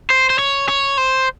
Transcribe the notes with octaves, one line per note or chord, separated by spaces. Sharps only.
C5
C5
C#5
C#5
C5